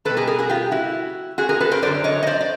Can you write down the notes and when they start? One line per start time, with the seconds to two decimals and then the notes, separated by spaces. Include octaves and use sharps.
0.05 E2 B2 G3 A4 B4
0.17 G#4 A#4
0.27 G#4 A#4
0.39 F#4 G#4
0.49 F4 G4
0.72 E4 F#4
1.38 F#4 G#4
1.49 G#4 A#4
1.61 A4 B4
1.72 A#4 C5
1.82 F#2 D3 F#3 C5 D5
2.04 C#5 D#5
2.23 D#5
2.27 C5 D5
2.41 D5